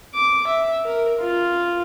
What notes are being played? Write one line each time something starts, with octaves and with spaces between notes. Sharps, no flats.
D6
E5
A#4
F4